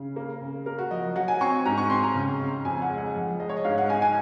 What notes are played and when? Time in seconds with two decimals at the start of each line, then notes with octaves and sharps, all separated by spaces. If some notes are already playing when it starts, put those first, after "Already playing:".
Already playing: C#3
0.16 A#3
0.41 C#3
0.66 A#3 A#4
0.79 F#4
0.91 F3 D#5
1.16 F#3 F#5
1.28 G#5
1.41 C4 C#6
1.65 G#2 A#5
1.78 C#6
1.90 C4 C6
2.03 A#5
2.15 C#3
2.40 C#3
2.65 F2 G#5
2.82 F#5
2.90 G#3
2.98 F#5
3.15 F3
3.40 G#3 D#5
3.49 C#5
3.57 D#5
3.64 G#2 F5
3.78 F#5
3.89 D#4 G#5
4.02 G#5